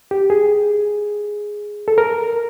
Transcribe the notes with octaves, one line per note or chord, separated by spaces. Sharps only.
G4
G#4
A4
A#4